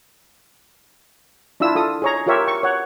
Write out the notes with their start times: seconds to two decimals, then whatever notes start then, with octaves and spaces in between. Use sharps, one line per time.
1.60 D4 E4 F4 E6
1.75 F4 A4 D#6
2.02 G#4 C#5 A#5
2.26 F4 G4 A#4 C#5 E5
2.48 C#6
2.63 C#5 F#5